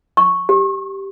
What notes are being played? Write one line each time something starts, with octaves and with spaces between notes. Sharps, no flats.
C#6
G4